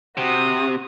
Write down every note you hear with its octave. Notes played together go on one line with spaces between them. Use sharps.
C3 F#4 D#6